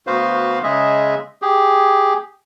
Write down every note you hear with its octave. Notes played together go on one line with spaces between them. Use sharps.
D2 B3 F#4 B4 C5 F5
C#3 G#3 G#4 D#5 E5
G4 G#4